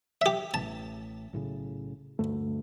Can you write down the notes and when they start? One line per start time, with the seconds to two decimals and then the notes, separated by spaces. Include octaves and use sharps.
0.21 G4 E5
0.54 A1 A5
1.33 B1 A2 C#3
2.19 D2 G2 A3